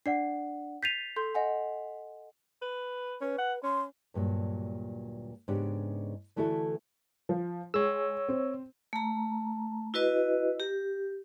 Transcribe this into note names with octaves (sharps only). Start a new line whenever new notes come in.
D4 D5 F#5 C7
G6 A6 B6 C7 D#7 F7
A4 C6 G6
D#5 F#5 G#5
B4
C#4 B4
F#5
C#4 C6
D2 G2 A#2 F#3
G#2 C#3 B3 D4 G4
D3 E3 A3 E4 F#4 A4
F3
G#3 C#5 E6
C4
A3 A#5
E4 F#4 B4 D#5
G4